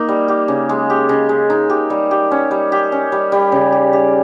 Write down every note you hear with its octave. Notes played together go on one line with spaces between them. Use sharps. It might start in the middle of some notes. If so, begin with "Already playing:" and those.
Already playing: A#3 D#4
G3
G4
C#3
G#3
G4
C#3
G#3
D#4
G4
G3
G4
C#4
G3
G4
C#4
G3
G3
C#3
G4
G4